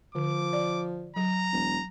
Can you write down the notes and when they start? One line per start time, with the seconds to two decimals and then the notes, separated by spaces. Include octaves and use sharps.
0.15 D3 F3 D6
0.53 D5
1.16 F#3 A#5
1.53 E1